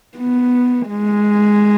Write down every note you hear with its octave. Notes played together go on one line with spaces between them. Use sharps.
B3
G#3